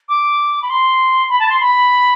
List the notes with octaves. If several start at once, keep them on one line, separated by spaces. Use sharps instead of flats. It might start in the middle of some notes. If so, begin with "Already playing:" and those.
D6
B5
C6
B5
A5
C6
B5